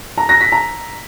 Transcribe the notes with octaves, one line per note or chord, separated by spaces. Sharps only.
A#5
A#6
B6
A#5